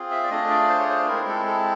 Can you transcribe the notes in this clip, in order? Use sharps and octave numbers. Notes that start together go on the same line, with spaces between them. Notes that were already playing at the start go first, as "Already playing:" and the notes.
Already playing: C4 F4 G#4
E5
D5
A3 D4 F4 G#4 D#5
D5
C5
C#5
C5
G#3 C4 E4 A#4
A4
A4